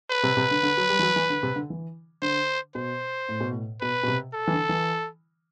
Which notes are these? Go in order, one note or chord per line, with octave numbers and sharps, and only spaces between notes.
B4
C3
C3
D3
D3
F#3
G3
E3
F#3
E3
D3
C3
D3
E3
D3 C5
B2 C5
A2
B2
A2
B2 B4
B2
C3
A4
E3
D3
E3